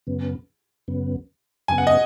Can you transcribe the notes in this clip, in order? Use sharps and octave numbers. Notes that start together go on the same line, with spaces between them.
F#2 C#3 B3
F#2 C#3 B3
F#2 C#3 B3 G#5
F#5
D#5